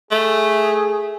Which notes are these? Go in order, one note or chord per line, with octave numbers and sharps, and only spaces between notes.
A3 G#4